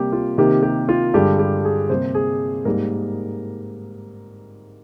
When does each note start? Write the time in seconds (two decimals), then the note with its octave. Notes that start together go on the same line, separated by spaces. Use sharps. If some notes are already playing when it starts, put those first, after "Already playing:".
Already playing: C3 G3 A#3 G4
0.13 F4
0.38 C3 D#3 A#3 G4
0.63 G4
0.89 F4
1.14 G2 D3 G#3 G4
1.39 G4
1.65 G#4
1.90 C3 G3 A#3 C5
2.15 G#4
2.65 G#2 G3 A#3 A#4